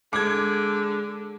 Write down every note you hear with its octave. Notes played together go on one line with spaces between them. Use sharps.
D3 G#3 G#4 D6 G#6